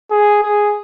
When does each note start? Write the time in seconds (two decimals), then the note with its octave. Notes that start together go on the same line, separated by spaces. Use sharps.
0.11 G#4
0.43 G#4